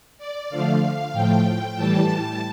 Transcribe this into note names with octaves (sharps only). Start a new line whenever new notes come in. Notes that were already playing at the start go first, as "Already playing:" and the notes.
D5
D3 F3 A3 F5
A2 F3 A3 G5
A2 E3 G3 A5